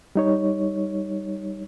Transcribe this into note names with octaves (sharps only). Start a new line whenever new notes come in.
G3 D#4 C#5